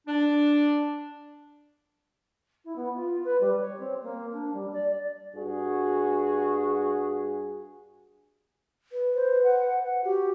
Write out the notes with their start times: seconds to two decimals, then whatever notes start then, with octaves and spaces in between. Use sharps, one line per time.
0.07 D4
2.65 E4
2.76 B3
2.95 F4
3.24 B4
3.41 G3
3.60 C#5
3.79 C4
4.02 A#3
4.32 D4
4.53 G3
4.73 D5
5.35 G2 F#4 G#4
8.92 B4
9.15 C5
9.44 F#5
9.84 F#5
10.04 F#4 G4